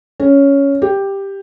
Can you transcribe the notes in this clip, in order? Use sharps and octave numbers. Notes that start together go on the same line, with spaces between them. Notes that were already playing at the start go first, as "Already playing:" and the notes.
C#4
G4